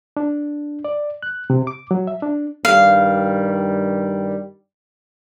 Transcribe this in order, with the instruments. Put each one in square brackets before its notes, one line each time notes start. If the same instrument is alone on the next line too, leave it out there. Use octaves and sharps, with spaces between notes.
[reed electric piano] D4
D5
F#6
C3
D6
F#3
E5
D4
[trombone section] G2 D#3 G3 [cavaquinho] F5